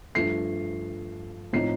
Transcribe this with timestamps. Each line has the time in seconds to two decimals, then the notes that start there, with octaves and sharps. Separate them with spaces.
0.15 G2 F3 A3 C7
1.53 A2 F3 C4 D#4 C7